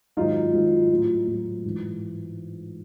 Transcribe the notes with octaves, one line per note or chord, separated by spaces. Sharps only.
G#2 D#3 F#3 D#4 F4
G#2 D#3 F#3
A2 F#3
A2 F#3
G#2 E3